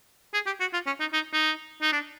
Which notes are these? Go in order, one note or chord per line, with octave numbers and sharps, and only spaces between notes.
G#4
G4
F#4
F4
C#4
D#4
D#4
D#4
D#4
D4